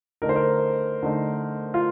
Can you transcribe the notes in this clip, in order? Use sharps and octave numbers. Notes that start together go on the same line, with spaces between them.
D3 A3 D#4 A#4
C5
A#4
D3 A3 D#4
F4